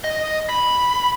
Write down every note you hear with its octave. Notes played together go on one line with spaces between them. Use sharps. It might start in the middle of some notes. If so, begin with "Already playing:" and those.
D#5
B5